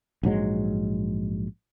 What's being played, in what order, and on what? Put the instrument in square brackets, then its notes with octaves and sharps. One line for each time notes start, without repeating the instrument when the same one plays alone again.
[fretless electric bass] A#1 G#2 F#3 G#3